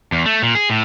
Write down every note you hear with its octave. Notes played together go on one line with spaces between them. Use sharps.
E2
A3
A#2
G#4
A2